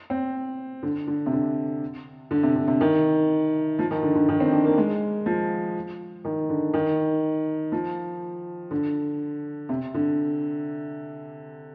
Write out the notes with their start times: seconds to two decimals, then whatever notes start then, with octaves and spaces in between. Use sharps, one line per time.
0.10 C4
0.83 D3
1.07 D3
1.26 C3
1.33 D3
2.31 D3
2.43 C3
2.56 D3
2.68 C3
2.81 D#3
3.79 F3
3.91 D#3
4.03 D3
4.15 D3
4.29 D#3
4.40 C4
4.52 D4
4.65 A#3
4.78 G#3
5.26 F3
6.25 D#3
6.49 D3
6.74 D#3
7.72 F3
8.71 D3
9.69 C3
9.94 D3